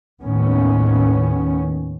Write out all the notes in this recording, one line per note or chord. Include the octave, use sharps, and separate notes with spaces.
D#2 A2 D#3 B3 C#4